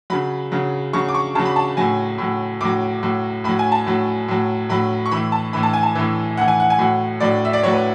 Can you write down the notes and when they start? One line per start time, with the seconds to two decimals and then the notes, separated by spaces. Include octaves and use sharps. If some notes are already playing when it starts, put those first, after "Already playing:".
0.10 C#3 F#3 B5
0.52 C#3 F#3
0.93 C#3 F#3 C#6
1.08 D6
1.15 C#6
1.35 C#3 F#3 A5
1.46 B5
1.56 A5
1.77 A2 F#3 G#5
2.18 A2 F#3
2.61 A2 F#3 D6
3.03 A2 F#3
3.44 A2 F#3 B5
3.59 G#5
3.72 A5
3.87 A2 F#3
4.28 A2 F#3
4.69 A2 F#3 B5
5.06 C#6
5.11 A2 E3 B5
5.32 A5
5.53 A2 E3 B5
5.63 A5
5.73 G#5
5.83 A5
5.95 A2 E3
6.37 A2 E3 F#5
6.48 G#5
6.60 F#5
6.70 G#5
6.79 A2 F#3 F#5
7.20 A2 F#3 D5
7.45 E5
7.53 D5
7.63 A2 F#3 C#5
7.73 B4